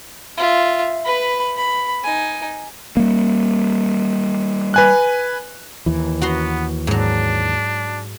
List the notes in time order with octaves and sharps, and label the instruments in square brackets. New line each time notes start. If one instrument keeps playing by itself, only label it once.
[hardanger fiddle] F4 E5
B4 B5
B5
D#4 G#5
[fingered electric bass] G3 A#3
[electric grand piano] B4 G#5 F#6
[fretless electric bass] D#2 E3
[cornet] B3 [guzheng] F#4 A#5 C6
[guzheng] G#2 F#3 [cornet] D4